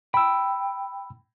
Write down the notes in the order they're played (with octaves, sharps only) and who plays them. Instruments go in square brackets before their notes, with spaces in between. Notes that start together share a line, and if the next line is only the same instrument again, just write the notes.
[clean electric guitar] G5 [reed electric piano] B5 E6